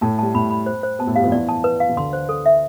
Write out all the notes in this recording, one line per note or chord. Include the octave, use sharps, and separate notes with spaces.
A2 A3 A5
G3 A5
A2 A3 B5
B5
C5
C5
B2 B3 A5
A2 A3
G2 G3 F5
F2 F3
E2 E3 D5
A5
B4
F5
E3
D2 D3 C6
C5
A4
E5